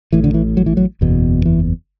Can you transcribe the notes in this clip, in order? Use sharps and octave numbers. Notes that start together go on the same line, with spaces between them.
A1 A2 E3
D3
E3
F#3
E3
F#3
F#1 E2 B2
E3